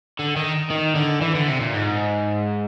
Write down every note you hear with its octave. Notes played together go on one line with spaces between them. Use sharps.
D3
D#3
D#3
D3
E3
D3
C3
A#2
G#2